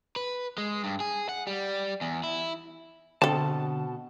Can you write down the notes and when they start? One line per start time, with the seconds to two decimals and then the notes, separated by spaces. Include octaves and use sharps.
0.16 B4
0.58 G#3
0.84 G2
1.00 G#4
1.29 F#5
1.47 G3
2.01 E2
2.23 E4
3.22 B2 D3 C4 A4 A5